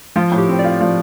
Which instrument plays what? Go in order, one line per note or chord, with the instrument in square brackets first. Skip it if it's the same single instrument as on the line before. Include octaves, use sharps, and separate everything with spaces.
[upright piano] F3 [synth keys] F4
[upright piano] A2
[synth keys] G4
[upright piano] C4
[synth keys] D5
[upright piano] F4
F3